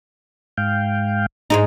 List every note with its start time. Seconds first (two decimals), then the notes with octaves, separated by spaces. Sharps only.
0.58 G#2 F5 G5
1.50 G#2 G#3 D#4